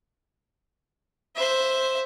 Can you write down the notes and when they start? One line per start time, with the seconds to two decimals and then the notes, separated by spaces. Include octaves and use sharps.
1.36 C5 E5